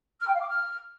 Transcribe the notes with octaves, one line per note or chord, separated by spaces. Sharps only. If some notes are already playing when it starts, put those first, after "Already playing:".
F6
G5
F5
D6
F6